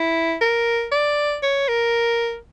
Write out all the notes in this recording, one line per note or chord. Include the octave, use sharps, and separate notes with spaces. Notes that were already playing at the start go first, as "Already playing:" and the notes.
Already playing: E4
A#4
D5
C#5
A#4